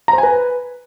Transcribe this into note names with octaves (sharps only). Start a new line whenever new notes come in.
A#5
C5
G#5
B4